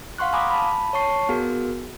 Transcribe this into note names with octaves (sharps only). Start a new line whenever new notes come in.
F5 F#5 C6 C#6 F#6
F5 G#5 A#5 B5 D6 D#6
A5 B5
C#5 A5 C#6 C7
B3 F#4 G#4 A#4